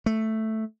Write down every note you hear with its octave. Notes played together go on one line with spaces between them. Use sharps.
A3